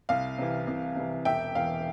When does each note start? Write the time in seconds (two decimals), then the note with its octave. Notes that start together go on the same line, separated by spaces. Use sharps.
0.09 C2 F5
0.38 C3 E3
0.67 C2
0.96 C3 E3
1.25 E1 E5 G5
1.55 E2 E3 F5